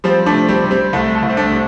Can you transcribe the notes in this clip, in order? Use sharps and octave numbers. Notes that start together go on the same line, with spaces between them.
F3 G3 C4
A3 D4
C3
G3 C4
C3
G3 C4
C2 A3
A3
C2
C4
A3 D4
C3